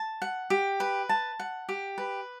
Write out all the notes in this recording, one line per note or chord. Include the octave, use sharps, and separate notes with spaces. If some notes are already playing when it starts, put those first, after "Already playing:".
Already playing: A5
F#5
G4
B4
A5
F#5
G4
B4